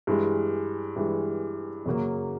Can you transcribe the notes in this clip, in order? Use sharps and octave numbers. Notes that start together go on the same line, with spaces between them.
G2 E3 G#3
G2 E3 G#3
F#2 C#3 F#3 A#3